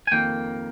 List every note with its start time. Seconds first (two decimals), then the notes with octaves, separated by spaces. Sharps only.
0.07 G#5
0.12 F2 D#3 A#3 G5